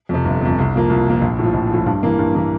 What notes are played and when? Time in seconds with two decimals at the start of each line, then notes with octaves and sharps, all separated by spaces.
0.09 F2 C3
0.25 G1
0.41 F2 C3
0.58 C2
0.74 A#2 F3 A#3
0.90 C2
1.06 A#2 F3 A#3
1.21 A#1
1.39 A2 F3
1.54 A#1
1.70 A2 F3
1.86 G2
2.03 E3 A#3
2.19 G2
2.35 E3 A#3